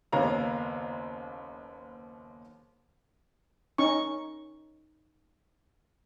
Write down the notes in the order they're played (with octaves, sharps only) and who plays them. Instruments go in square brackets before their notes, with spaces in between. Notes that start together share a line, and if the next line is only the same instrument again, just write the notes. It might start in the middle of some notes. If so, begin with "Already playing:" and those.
[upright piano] F#1 D#2 B3 C#5 F5 A#5
[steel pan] C#4 D#4 C#6